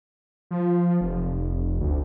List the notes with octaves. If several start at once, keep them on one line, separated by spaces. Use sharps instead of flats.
F3
F1
D2